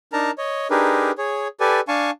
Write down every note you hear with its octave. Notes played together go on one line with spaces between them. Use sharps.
D4 D#4 A#4 A5 A#5
C#5 D#5
D4 D#4 G4 G#4 A#4 B4
G#4 C#5
G4 A4 B4 D5 G#5
D4 F5 G#5 A5 C#6